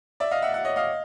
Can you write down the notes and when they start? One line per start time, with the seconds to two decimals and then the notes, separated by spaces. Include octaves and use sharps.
0.20 D5 E5
0.31 D#5 F5
0.42 E5 F#5
0.54 E5 F#5
0.65 C#5 D#5
0.76 D#5 F5